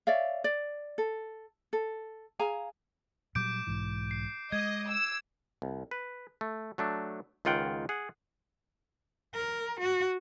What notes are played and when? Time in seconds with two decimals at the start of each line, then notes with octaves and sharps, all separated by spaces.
0.07 C#5 D5 E5 F5
0.44 D5
0.98 A4
1.73 A4
2.39 G#4 F5 G#5 A#5
3.35 A#2 F#3 G3 D6 G6 D7
3.67 B1 G#2 E3
4.11 C7
4.52 G#3 D#5 G#6
4.89 E6
5.62 C2
5.91 B4
6.41 A3
6.78 F#3 A3 D4
7.45 C#2 D#3 F4 F#5 G5
7.89 G#4 F#5
9.35 A#4
9.81 F#4